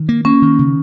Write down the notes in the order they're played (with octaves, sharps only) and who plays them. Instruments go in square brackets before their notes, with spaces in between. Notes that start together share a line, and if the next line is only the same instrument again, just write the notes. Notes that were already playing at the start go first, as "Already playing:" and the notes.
Already playing: [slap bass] D#3
A#3
[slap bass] A#3 [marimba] C#4
[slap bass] D#3
C#3